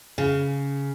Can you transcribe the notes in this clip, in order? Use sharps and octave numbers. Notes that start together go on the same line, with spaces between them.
C#3